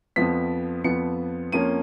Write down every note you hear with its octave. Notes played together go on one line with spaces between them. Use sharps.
F2 F3 B3 B6
F2 F3 B3 C#7
F2 F3 A#3 C#4 D#7